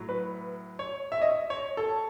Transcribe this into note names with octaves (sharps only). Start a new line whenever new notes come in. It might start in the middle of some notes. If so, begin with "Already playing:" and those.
Already playing: A2 F#3
B4
C#5
E5
D#5
C#5
A4